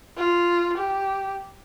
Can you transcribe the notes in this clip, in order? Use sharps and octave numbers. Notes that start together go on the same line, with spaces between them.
F4
G4